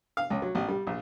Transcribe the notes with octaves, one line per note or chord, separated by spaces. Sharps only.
F5
C#2
F#3
A1
G3
A#1